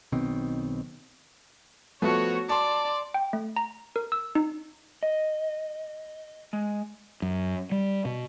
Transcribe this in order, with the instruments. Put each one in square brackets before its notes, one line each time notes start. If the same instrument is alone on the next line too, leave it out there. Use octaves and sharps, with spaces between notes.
[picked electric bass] B1 B2 D#3 C4
[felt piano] F3 A3 B3 [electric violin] F#4 C#5
[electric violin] D5 [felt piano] A5 C6
[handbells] G5
A3
A#5
A#4
E6
D#4
[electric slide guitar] D#5
G#3
[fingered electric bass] F#2
G3
B2